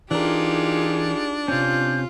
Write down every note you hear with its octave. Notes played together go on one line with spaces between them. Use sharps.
E3 D4 D#4 F4 G4 G#4 A#4
C3 C4 C#4 F4 G6